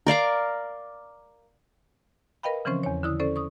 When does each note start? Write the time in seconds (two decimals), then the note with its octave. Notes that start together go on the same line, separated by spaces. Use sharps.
0.07 A#4 D5 F5 A#5
2.43 A#4 B4 D#5 F5 G5 B5
2.65 C#3 E3 F3 C4 C#4 C5
2.83 E2 C#5
3.03 D3 E4 D#6
3.20 C#4 A4 C5 D5
3.36 C#6 D#6